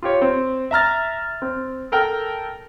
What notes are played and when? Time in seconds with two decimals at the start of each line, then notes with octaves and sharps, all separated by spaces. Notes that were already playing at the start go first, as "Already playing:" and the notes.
0.03 F4 G4 C#5
0.22 C4
0.71 E5 A#5 F6 A6
1.42 C4
1.92 A4 A#4 G5